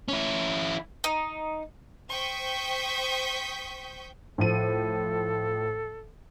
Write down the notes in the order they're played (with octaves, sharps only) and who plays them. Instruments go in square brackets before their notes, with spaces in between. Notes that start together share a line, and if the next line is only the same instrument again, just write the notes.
[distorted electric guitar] C#4 E4
[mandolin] D#4
[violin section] C5 G5 C#6 D#6 G6 B6
[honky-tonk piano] A2 F3 D#7 [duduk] A4